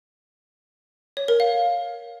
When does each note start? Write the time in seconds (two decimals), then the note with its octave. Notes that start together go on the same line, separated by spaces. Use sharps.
1.17 C#5
1.28 A#4
1.40 F5